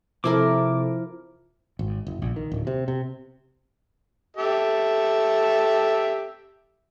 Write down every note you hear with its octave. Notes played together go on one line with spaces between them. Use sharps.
C3 F3 E4 A4 A#4 D6
G#1
F#1
A#1
D#3
D1
C3
C3
G4 A4 E5